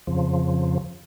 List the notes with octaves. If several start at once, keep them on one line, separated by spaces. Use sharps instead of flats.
F2 C#3 F3